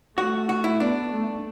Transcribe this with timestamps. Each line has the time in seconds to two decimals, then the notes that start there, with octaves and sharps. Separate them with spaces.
0.18 A3 F#4
0.49 F#4
0.64 E4
0.80 B3 D4
1.12 A3